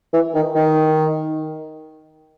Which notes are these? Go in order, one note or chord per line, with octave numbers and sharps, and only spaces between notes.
E3
D#3
D#3